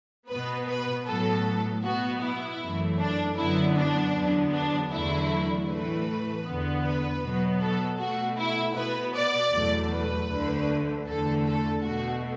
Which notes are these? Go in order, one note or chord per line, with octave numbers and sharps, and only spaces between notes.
B2 B3 B4
B4
A2 F#3 B3 A4
B2 B3 F#4
E4
F#2 E3 A3
D4
F#2 D3 F#3 B3 E4
D4
E2 D3 F#3 B3
D4
E2 D3 F#3 A3 E4
A2 E3 A3 B4
E2 D3 B3
B4
B2 F#3 B3
A4
B2 A3 F#4
E4
B2 B3 B4
D5
E2 B2 F#3 A3
B4
D2 D3 A3
E2 D3 A3 A4
A4
B2 A3 F#4